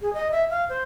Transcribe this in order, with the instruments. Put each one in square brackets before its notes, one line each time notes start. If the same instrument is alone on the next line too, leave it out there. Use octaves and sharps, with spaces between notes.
[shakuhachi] G#4
D#5
E5
F5
C5